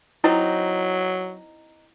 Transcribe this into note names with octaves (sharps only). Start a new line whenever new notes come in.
F#3 C4 D#4 E4